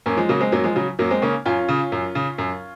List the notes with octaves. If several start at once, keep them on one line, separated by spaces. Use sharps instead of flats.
F#2 A#3 C#4
F3 G#3
C#3 F#3 A#3
G#3 C4
F#2 F#3 A#3
F3 G#3
C#3 F#3
F#2 F#3 A#3
G#3 C4
C#3 A#3 C#4
F#2 C#4 F4
C#3
F#2
C#3
F#2